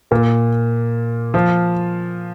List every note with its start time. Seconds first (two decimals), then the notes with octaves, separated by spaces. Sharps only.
0.11 A#2 A#3
1.34 F3 F4